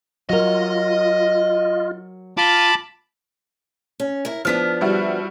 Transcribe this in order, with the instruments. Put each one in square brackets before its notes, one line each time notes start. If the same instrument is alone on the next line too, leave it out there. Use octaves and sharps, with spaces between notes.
[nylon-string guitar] F#3 A#4 [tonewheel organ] F4 [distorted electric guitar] D#5
[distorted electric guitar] F4 [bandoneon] A5 B5 D6
[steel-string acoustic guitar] C#4
E4 A#4
[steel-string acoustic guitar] F3 B3 D4 [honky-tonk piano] F6 B6
[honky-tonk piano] G3 E4 F#4